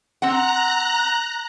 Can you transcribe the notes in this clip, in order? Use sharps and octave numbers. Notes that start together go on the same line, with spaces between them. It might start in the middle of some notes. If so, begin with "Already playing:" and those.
C4 F#5 A#5 F#6